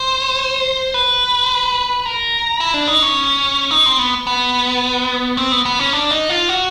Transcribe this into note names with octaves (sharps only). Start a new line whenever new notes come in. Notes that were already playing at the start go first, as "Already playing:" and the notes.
Already playing: C5
B4
A#4
E4
D4
D#4
C#4
D#4
C4
B3
B3
C4
B3
B3
C#4
D4
D#4
F4
F#4